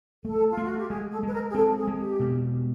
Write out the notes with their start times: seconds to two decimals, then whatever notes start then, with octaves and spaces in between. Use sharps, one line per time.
0.25 A3 A4
0.51 F4
0.57 A3
0.64 F#4
0.77 G4
0.90 G#3 G#4
1.11 A4
1.23 G#3 B4
1.33 A#4
1.49 G#4
1.55 C4 A4
1.77 G#4
1.87 G#3
1.98 G4
2.20 B2